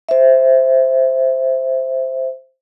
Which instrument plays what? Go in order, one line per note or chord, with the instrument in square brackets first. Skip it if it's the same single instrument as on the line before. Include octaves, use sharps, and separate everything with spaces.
[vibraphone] C5 E5